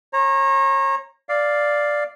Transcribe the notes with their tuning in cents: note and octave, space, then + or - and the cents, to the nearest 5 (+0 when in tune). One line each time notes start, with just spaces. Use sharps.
C#5 -35 A#5 +0
D5 +0 F5 +0